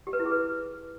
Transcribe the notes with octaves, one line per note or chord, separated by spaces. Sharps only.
G4
B4
E4
G#4
B4